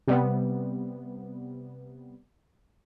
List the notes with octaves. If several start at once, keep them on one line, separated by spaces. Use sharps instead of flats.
C3 G3 B3